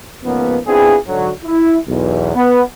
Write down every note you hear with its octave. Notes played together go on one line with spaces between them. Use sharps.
C#2 G#2 C#3 F3 A#3 B3
B3 C4 D4 E4 F4 G#4
G#2 D3 F#3
E4
B1 E2
B3